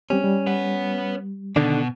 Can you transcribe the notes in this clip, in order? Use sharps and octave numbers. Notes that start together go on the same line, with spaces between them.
G3 C4 C#4 G4
G3
B4 F#5
B2 D3 D#3 D4